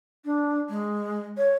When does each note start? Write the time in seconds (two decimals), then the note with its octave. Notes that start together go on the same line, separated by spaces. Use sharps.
0.25 D4
0.69 G#3
1.38 C#5